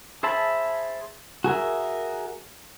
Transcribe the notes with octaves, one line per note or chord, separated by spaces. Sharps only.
G#4 C5 E5 A5 B5
F#4 G#4 A#4 E5